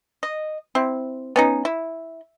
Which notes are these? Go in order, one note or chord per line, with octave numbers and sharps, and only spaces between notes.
D#5
C4 E4
B3 C#4 D#4
E4